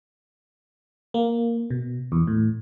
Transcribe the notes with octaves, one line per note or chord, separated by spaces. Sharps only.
A#3
B2
E2
A2